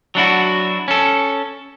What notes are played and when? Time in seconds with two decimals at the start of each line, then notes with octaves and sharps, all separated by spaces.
0.15 F#3 D4 E4 F#4
0.88 C#4 A4